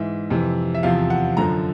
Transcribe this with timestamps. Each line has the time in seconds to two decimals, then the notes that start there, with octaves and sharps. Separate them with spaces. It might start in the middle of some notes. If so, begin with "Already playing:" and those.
Already playing: G#2 E3 E5
0.30 F2 C3 E3
0.74 E5
0.83 E2 C3 F3 F5
1.10 F#5
1.37 F#2 D3 F3 A#5